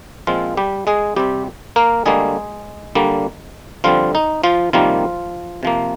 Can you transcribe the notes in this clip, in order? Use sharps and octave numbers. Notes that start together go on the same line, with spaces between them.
A#2 F3 G#3 C4 F4
G3 G4
G#3 G#4
C3 G3 C4 G4
A#3 A#4
D3 G3 G#3 A#3 G#4
D3 G3 A#3
D3 F3 G3 C4 F4
D#4
F3 F4
C3 D#3 F3 G3 A#3 F4
C3 F3 A#3